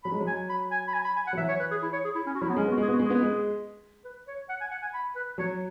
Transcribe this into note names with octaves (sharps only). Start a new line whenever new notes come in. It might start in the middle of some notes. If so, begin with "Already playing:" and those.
F#3 B5
G#3
F#3
G#5
B5
G#5
B5
G#5
B5
G#5
F#5
F#3
E3 E5
C#5
B4
G#4
E4
C#5
G#4
E4
C#4
F#4
F#3 E4
B3
G#3 C#4
B3 F#4
G#3 G#4
B3 F#4
G#3
G#4
B3
G#3
B4
C#5
F#5
G#5
F#5
G#5
B5
B4
F#3 C#5